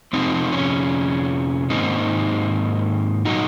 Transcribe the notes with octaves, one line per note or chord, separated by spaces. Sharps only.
F2 C3 F3 C4 D#4
C#4
G#2 D#3 A#3 C4 D#4
A#2 F#3 A#3 D#4 F#4